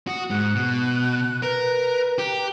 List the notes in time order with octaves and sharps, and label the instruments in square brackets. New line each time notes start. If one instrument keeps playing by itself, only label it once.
[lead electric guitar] F#4 [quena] D#6
[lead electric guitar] G#2 [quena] F#6
[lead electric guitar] B2
[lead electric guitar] A#4 [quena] B4
[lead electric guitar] G4 [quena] A#5